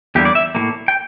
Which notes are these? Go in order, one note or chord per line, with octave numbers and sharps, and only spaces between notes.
E2 D3 G3 A#3 G4
D5
E5
A2 G3 A#3
G5